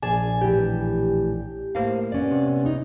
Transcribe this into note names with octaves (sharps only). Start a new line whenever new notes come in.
A#1 G#4 D5 G#5 A5
A2 E3 G4
A2 A#3 C5 F5
B3 C#4 D5
C3
B2 D#4